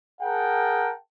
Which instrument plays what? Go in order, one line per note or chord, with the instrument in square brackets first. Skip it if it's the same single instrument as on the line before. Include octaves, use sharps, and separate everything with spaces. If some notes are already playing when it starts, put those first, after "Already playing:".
[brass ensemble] G#4 A#4 F#5 G5 A5